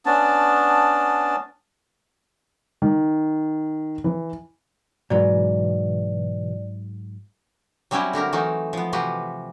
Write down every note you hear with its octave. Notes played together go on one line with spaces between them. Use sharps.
B3 C#4 D4 A5
D#3
E3
G#2 B2 E3 F#3 D5
F#3 G3 C4 C#4 E4 F#4
D3 F#4 G4 A#4
E3 F#3 A3 D#4 F#4
F3 B3
C3 E3 F3 F#4 G4 B4